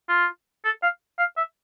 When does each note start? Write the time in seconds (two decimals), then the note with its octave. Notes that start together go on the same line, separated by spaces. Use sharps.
0.09 F4
0.65 A4
0.83 F5
1.19 F5
1.37 E5